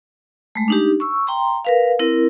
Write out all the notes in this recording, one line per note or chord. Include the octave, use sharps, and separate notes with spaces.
G#3 A3
D4 D#4 G4
C#6 E6
G5 A#5 C6
A#4 B4 F5
C4 E4 A#4